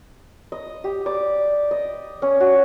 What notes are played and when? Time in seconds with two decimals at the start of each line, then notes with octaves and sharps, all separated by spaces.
0.52 D#5
0.84 G4
1.06 D5
1.71 D#5
2.22 C#4
2.40 F#4